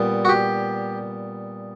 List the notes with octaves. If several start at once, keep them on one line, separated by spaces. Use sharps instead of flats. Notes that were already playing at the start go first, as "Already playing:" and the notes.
Already playing: A#2 G3 B3
F#4
G4